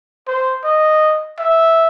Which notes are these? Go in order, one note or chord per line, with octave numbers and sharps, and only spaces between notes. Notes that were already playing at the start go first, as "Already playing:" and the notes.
C5
D#5
E5